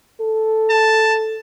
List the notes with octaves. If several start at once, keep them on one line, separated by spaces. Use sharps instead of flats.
A4
A5